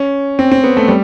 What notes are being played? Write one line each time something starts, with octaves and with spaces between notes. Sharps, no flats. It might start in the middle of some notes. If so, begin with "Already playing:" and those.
Already playing: C#4
C4
C4
B3
A3
G3